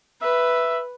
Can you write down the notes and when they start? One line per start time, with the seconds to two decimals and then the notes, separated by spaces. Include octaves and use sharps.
0.22 B4 E5